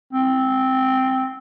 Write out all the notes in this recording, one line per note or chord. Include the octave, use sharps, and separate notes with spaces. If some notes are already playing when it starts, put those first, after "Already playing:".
C4